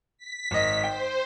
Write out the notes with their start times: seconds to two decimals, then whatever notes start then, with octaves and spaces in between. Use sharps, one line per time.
0.18 B6
0.51 G#1 D#5
0.84 C5 G5